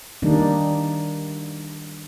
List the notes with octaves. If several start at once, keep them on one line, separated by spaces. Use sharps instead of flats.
D#3 G3 A#3 D4 D#4